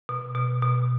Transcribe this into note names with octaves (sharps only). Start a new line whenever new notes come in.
B2
B2
B2